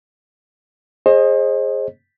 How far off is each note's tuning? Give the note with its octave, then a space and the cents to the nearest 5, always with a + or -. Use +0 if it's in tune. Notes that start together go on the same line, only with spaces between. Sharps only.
G#4 +0 C5 +35 D#5 -5